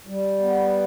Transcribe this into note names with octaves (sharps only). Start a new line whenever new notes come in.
G3
B3